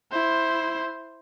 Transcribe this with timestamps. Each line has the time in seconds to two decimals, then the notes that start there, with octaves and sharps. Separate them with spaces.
0.11 E4 C5